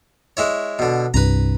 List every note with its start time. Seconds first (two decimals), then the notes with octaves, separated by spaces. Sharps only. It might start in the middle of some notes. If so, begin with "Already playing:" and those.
0.37 G#3 E4 C#5
0.79 B2 D3
1.14 C2 G2 B4 A#5